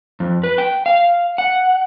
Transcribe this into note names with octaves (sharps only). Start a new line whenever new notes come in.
F2
B4
G5
F5
F#5